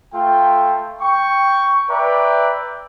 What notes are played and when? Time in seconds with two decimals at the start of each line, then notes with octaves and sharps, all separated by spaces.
0.13 A3 F4 G5
1.01 G5 C#6
1.89 B4 D5 E5 G5 A#5